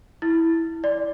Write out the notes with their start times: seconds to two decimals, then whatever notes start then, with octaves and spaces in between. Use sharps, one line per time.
0.22 E4
0.84 D5